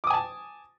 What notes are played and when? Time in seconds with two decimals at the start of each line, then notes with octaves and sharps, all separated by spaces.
0.04 D6
0.07 D#6
0.10 G#5
0.14 A5